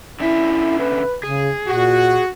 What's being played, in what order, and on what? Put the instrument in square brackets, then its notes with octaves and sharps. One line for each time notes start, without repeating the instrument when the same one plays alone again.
[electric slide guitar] D3 C#4 E5 [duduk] E4
[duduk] B4
[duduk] C#3 [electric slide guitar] G#4
[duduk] A#2 [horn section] F#4